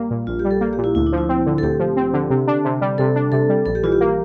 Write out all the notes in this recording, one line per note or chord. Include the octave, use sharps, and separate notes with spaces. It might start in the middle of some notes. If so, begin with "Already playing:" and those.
Already playing: A#1 G3 A#3
A#2
A#1 F4
G4
G3
A4
A#3 G4
G4
A#2
E4
D2 E4
D4
F3
E4
C4
D3
A4
D2 G4
F3
C4
D3
C3
D4
C3
G3
C3 A4
D4
C3 A4
G3
A#1 A4
G4
E3 F4
G4
A#3